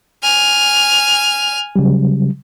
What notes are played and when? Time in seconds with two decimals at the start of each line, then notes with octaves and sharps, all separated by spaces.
0.23 G#5 F6
1.76 C#3 F#3 G3